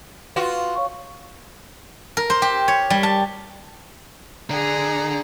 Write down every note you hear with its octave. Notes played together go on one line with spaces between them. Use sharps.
F4 F#4 B4
C#5 F5 C#6
A#4
C5
G4
C#5
G3
A5
D3 G#4 A#5